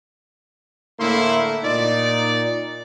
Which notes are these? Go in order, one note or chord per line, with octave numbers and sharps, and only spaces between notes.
A2 D3 A3 A#3 E4 C6
A#2 D#4 D5